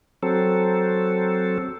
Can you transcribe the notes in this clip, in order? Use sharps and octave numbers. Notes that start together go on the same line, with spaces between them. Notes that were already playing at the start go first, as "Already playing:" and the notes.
F#3 C4 A4